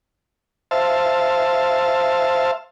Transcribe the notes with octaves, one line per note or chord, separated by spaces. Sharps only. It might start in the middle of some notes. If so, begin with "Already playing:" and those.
C5 E5 F5 A5